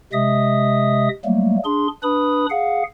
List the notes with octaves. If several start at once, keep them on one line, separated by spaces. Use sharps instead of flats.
C3 G#3 D#5 E5 D#6
F#3 G3 A3 A#3
D4 G#4 C6
D4 B4 B5 D#6
G#4 F5 F#5